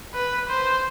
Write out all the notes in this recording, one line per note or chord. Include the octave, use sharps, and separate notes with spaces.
B4
C5